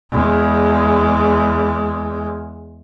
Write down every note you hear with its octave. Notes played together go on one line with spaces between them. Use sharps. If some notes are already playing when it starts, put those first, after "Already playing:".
E2 G#3